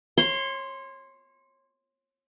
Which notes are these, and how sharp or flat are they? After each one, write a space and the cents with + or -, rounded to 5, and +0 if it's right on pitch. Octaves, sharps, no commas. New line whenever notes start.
C#5 -30 C6 +0